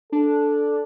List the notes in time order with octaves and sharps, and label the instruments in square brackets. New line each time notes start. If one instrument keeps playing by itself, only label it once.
[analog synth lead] D4 [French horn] A4